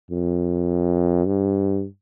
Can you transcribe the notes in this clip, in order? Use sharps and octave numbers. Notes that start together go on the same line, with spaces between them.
F2
G2